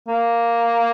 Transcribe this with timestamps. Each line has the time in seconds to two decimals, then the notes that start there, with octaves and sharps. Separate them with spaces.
0.08 A#3